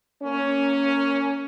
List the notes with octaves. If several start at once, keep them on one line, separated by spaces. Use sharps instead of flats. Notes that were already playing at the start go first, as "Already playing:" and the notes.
A#3 C#4